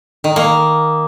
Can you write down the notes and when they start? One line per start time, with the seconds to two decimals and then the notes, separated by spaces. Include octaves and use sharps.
0.24 D#3
0.36 A#3